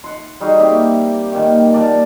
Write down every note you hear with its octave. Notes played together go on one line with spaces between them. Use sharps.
F#5 C6
G3 D#4 F#4 G#4
C3 A#3 G4 E5
A#2 D#3
A#2 A#4 D5 A5